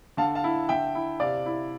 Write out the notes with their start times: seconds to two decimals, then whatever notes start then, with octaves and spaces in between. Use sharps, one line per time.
0.17 D3 F5 A5
0.35 F5 A5
0.44 E4
0.69 D3 E5 G5
0.95 E4
1.20 C3 D5 F5
1.46 E4